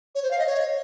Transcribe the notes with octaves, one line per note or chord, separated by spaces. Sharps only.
C#5
C5
F5
D#5
C#5